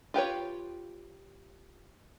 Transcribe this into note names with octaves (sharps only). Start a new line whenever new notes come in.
F4 G4 B4 C#5